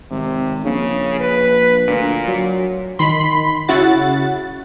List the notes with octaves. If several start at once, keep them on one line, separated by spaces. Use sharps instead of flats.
G#1 C3
A#1 C#3
B4
D2 A#2
F#3
D#3 B5 C6
C#3 E4 F#4 F#5 A6